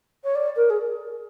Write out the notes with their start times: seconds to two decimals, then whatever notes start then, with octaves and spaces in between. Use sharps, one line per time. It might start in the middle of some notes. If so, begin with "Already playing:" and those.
0.24 C#5
0.35 D5
0.56 A#4
0.69 G#4